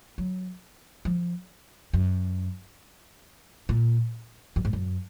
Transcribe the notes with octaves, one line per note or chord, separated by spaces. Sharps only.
F#3
F3
F#2
A#2
F#2
G#2
F#2